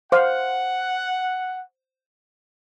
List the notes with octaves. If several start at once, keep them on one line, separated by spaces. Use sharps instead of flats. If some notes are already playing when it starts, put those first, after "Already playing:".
C5 F5 F#5